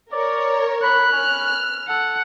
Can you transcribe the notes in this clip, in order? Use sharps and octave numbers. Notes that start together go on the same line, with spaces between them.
A#4 C#5 D5
B5 F#6
C#4 F6
A4 F#5